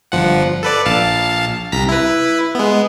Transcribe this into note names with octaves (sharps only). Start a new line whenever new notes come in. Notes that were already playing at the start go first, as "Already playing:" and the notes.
G1 F3 F#5
A4 B4 D5
A#1 F5 A5
C2 A#5 B6
E4 B4
G#3 B3